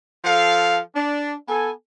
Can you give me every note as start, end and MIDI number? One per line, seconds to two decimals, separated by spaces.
0.24 0.79 53
0.24 0.79 69
0.24 0.79 77
0.95 1.34 62
1.48 1.70 59
1.48 1.70 69
1.48 1.70 80